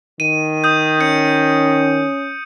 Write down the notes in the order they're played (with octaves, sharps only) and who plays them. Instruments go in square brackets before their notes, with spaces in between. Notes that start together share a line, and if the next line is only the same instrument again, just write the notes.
[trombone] D#3 [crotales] D#7
[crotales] D#6 G6
[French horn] C#4 [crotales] G6 C#7